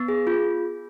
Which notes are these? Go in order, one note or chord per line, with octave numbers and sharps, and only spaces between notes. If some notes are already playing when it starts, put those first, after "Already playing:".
Already playing: B3
G#4
F4